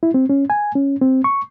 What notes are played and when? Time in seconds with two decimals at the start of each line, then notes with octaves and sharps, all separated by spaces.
0.03 E4
0.14 C4
0.29 C#4
0.50 G#5
0.75 C#4
1.02 C4
1.24 C#6